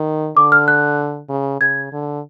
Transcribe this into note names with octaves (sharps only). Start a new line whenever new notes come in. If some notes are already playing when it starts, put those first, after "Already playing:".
Already playing: D#3
D3 D6
F6
F#6
C#3
C#3 G#6
D3